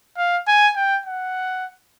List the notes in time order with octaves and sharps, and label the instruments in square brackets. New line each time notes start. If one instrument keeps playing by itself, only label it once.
[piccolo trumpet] F5
G#5
G5
F#5